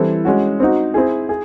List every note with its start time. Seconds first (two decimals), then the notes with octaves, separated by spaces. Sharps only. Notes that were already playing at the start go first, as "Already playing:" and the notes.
Already playing: E3 G3 C4 E4 A4
0.25 G#3 C#4 F#4
0.60 C4 D#4 F#4
0.94 C4 E4 G#4
1.29 G#4